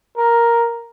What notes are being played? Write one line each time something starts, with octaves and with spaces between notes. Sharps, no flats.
A#4